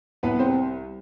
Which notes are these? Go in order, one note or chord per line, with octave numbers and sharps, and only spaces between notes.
C2 B3 B4
C4 C5
G3